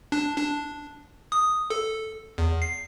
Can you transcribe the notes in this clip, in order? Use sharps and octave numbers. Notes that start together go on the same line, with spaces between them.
D4
D4
D#6
A4
E2
C7